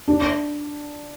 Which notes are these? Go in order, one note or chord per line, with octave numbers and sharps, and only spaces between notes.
D4